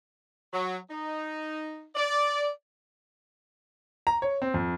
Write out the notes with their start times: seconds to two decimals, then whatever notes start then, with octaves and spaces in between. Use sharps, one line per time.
0.53 F#3
0.90 D#4
1.95 D5
4.07 A#5
4.22 C#5
4.42 C4
4.54 F2